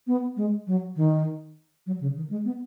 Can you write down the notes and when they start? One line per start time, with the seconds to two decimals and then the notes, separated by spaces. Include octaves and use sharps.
0.07 B3
0.37 G#3
0.67 F#3
0.96 D#3
1.86 F#3
2.00 C#3
2.16 D#3
2.30 G#3
2.45 B3